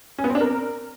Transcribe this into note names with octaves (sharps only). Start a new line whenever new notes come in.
C#4
B3
C4
D4
A#4